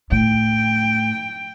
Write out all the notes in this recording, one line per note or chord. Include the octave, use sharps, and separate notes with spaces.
A2 G5